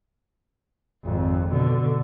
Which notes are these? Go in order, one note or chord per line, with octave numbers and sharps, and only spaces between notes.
G#1 F2
B2 D3